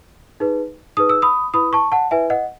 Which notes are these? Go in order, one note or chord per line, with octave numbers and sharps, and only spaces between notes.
D#4 G#4 B4
D#4 G#4 B4 D#6
E6
B5 D#6
E4 B4 B5 D#6
A5 C#6
F#5 A5
E4 B4 E5 G#5
D#5 F#5